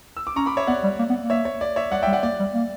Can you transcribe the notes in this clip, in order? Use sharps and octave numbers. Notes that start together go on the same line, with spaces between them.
E6
D6
C#4 A#5 C#6
B5 D6
C#5 E5
B3 D5 F#5
G3
A#3
B3
A#3
C#5 E5
C#5
D5
C#5 E5
G3 D5 F#5
E5 G5
G3
D5 F#5
A#3 D5
G3
A#3